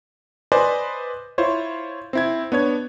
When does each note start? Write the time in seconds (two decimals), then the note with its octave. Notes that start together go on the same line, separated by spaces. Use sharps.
0.52 B4 C5 D5 D#5 G#5
1.38 E4 F4 C5 C#5
2.13 C4 E4 G#6
2.52 B3 D4 C#5 G#6